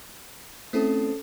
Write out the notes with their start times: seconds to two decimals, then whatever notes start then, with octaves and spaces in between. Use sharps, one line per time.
0.73 A3 C4 C#4 E4 A4